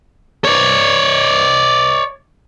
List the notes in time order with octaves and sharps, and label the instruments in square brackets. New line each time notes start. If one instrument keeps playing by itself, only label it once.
[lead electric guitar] C#5 D5